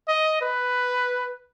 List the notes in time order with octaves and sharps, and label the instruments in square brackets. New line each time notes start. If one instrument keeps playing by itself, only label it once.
[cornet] D#5
B4